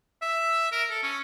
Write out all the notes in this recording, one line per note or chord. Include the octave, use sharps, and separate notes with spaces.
E5
A#4
A4
C#4